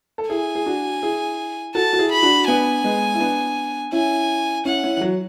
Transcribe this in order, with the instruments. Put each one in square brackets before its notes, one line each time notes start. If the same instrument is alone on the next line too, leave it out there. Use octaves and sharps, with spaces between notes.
[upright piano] A4
[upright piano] E4 G#4 [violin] G#5
[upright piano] G#4
D4 F#4
E4 G#4
[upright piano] F#4 A4 [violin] A5
[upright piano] F#4
E4 G#4
[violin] B5
[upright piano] D4 F#4
[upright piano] B3 D4 [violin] G#5
[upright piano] G#3 B3
E4
B3 D4
[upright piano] C#4 E4 [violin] G#5
[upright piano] C#4 E4 [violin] F#5
[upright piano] C#4 E4
E3
F#3